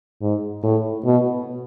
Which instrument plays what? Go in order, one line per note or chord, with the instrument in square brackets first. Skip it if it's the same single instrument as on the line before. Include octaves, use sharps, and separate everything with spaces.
[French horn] G#2
A2
B2